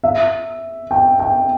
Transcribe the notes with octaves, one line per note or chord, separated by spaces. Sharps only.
E5
G5
G5